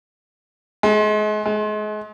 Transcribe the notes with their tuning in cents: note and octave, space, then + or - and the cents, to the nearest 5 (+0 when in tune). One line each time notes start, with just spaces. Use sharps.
G#3 +35
G#3 +35